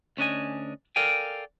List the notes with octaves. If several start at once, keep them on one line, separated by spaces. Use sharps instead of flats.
D2 C#4 D4 D#5 G#5
A4 A#4 D5 F5 G5 G#5